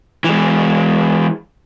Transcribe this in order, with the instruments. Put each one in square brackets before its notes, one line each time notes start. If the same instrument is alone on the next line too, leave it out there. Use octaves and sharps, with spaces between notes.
[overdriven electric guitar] E3 G#3